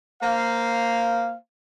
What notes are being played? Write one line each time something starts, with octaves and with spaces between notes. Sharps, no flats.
A#3 C5 F5